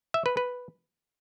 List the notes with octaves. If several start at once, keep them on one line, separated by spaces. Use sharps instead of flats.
E5
B4
B4